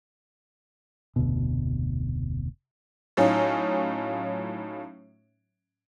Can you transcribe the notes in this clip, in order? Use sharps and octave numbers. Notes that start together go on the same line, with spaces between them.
F1 D2 B2
A2 F#3 C#4 D#4 F4